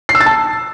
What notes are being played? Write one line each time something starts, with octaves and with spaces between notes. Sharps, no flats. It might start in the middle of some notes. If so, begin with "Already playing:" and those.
C7
E6
A6
A5